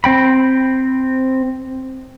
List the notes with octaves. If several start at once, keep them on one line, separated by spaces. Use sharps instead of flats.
C4 G5 B5